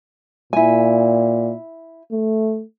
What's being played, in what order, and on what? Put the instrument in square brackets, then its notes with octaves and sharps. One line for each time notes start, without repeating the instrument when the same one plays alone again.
[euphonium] A#2 [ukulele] E4 G#5
[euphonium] A3